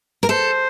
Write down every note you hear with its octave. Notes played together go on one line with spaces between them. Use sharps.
A#4
A4 C5